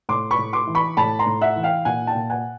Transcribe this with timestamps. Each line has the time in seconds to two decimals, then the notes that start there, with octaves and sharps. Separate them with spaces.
0.09 A2 C6 D6
0.31 B5 C#6
0.38 A2
0.53 C6 D6
0.67 E3
0.75 B5 C#6
0.97 A2 A5 B5
1.19 A#5 C6
1.27 A2
1.41 E5 F#5
1.56 E3
1.63 F5 G5
1.85 A#2 F#5 G#5
2.07 G5 A5
2.15 A#2
2.30 F#5 G#5